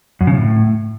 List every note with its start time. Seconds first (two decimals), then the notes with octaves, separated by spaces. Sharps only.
0.21 F#2
0.27 C#3
0.34 A2